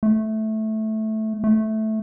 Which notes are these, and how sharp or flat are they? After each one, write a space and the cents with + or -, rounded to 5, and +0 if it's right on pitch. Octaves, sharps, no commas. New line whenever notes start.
A3 -10
A3 -10